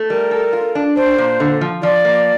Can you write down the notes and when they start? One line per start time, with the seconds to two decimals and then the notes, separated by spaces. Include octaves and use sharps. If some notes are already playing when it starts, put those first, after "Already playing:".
Already playing: A3
0.10 G3 A#4
0.31 A4
0.53 F4
0.75 D4
0.96 D4 C5
1.18 A#2
1.40 D3
1.61 F3
1.83 F3 D5
2.05 A#3